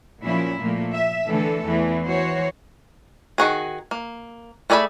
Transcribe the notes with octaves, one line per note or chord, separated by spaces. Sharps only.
A#2 F3 F#3 C#4 E4
A#2 F3 A3 A#3
E5
D3 E3 A3 A4
E2 E3
E3 F#4 C5 C#5
D#3 F#4 G#4
A#3
A3 G#4 D5 E5 B5